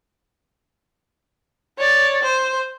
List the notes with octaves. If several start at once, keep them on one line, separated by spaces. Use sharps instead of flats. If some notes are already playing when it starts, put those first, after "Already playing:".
C#5 D5
C5